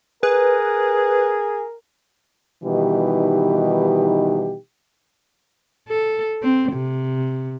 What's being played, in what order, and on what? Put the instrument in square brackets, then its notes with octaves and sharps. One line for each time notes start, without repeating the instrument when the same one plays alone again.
[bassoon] G#4 [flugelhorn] A#4 [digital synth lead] B4
[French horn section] B2 D#3 E3 G3 D#4 G4
[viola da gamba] A4
C4
C3